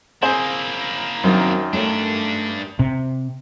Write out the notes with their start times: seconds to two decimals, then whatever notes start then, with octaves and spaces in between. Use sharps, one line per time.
0.23 A#3 C4 E4 G#4 C5
1.24 F#2 D#3 F#3 C4 D4
1.73 G2 A3 D4 A#4 C#5
2.79 C3